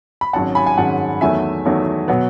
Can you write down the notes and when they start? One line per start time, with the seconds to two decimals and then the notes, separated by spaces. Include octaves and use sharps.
0.21 B5
0.33 G#1 G#2 D#3 F#3 C#4 F#5 A5
0.55 G#5 B5
0.66 G#5
0.77 G#1 G#2 D#3 F#3 C#4 F#5 A5
1.21 E2 D#3 F#3 A3 E5 G#5
1.65 E2 D#3 F#3 A3
2.08 B2 F#3 B3